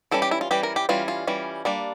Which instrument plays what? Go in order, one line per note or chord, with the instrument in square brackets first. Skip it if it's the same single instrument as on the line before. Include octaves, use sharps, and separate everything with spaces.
[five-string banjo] E3 G3 C#4 A4
G4
E4
F4
E3 G3 C#4 G4
A#4
G4
E3 G3 C#4 F4
F4
E3 G3 C#4
G3 A#3 D4